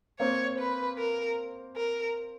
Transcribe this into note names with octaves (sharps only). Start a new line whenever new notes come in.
A#3 C4 C#5
B4
A#4
A#4